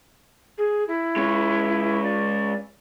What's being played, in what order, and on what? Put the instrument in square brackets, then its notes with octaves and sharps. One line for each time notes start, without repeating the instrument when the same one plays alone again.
[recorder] G#4
E4
[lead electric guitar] G#3 C#4
[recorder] D5